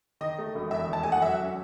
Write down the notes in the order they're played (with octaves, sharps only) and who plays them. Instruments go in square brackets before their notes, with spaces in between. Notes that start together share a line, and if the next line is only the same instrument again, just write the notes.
[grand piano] D#3 [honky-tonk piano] D#5
[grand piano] A3
E1
[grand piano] E2 [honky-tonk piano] E5
[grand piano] D#3 [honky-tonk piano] A5
[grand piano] A3 [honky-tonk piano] G#5
[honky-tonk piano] F#5
[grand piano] F#3 [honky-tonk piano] E5
[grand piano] C#4